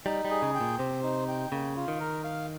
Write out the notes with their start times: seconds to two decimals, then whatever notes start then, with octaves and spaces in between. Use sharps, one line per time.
0.06 G3 D#4
0.25 G3
0.30 G#4
0.42 C#3
0.55 G5
0.61 A#2
0.79 C3 C5
1.03 D#4
1.28 G5
1.52 C#3 A#3
1.76 F4
1.88 D#3
2.00 A#4
2.24 F5